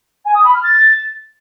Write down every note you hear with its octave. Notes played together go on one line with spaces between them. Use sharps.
G#5
D#6
B5
F6
A6